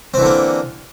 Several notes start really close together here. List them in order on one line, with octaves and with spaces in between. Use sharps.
C4 E3 D3 A#3